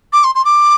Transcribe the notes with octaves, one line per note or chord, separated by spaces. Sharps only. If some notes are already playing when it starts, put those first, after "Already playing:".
D6
C6
C6
D6